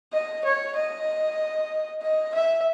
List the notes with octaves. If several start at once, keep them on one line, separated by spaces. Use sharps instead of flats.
D#5
C#5
D#5
D#5
E5